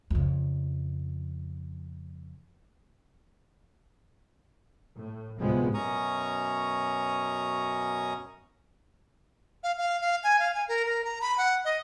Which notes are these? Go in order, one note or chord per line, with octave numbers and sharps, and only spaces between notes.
F2 C#3
A2
D2 A2 C3 F3 G#3 B3
F#2 B2 C#4 A#5 C#6 D#6
F5
F5
F5
G#5
F5
G#5
A#4
A#4
A#5
B5
F#5
D#5